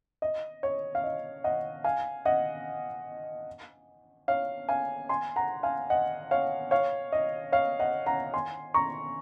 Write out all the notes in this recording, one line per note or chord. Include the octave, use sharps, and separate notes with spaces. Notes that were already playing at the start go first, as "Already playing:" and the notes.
D#5
C#5
F5
D#5
D#5 F#5
F5 G#5
D#5 F#5
C#5 F5
F5 G#5
G#5 C6
F#5 A#5
F5 G#5
D#5 F#5
C#5 F5
C#5 F5
D#5
C#5 F5
D#5 F#5
F#5 A#5
G#5 C6
A#5 C#6